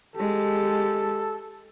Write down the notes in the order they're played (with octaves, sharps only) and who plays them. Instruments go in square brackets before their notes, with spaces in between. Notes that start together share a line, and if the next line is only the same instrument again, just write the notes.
[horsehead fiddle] G#3 G4 [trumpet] A4